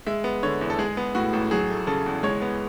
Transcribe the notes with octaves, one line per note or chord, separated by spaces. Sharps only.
G#3 E5
B3
D3 C#5
E2
A4
G#3 G#4
B3
A2 F#4
A1
F#3 G#4
A3
C#3 A4
E2
G#3 C#5
B3